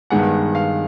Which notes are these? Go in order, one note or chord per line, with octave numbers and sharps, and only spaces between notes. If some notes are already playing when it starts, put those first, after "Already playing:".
G2 D#3 G#3 B3 F#5
F5